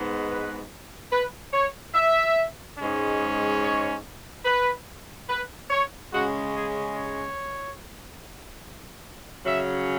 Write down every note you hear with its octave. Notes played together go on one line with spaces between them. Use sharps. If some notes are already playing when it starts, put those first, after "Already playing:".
Already playing: G#2 G#3 B3
B4
B4
C#5
E5
G#2 G#3 C#4
C#5
B4
B4
C#5
C#3 G#3 C#4 F#4
G#4
C#5
C#3 F#3 C#4 E5